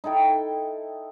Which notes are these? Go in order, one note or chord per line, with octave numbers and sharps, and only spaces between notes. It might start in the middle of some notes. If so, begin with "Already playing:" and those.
D#4 E4 A4 G5